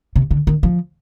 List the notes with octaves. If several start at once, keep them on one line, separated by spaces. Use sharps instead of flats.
C3
D3
D#3
F3